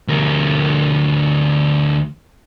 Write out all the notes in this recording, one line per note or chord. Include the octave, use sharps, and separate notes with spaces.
D2 A#4